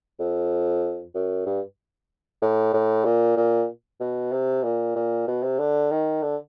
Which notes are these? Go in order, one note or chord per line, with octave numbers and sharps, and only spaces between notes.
F2
F#2
G2
A2
A2
A#2
A#2
B2
C3
A#2
A#2
B2
C3
D3
D#3
D3